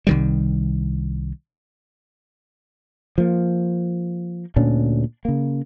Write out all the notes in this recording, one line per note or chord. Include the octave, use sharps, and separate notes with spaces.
C2 D#3 G3
F3 A#3
D2 A#2 C#4 D4
C#3 A#3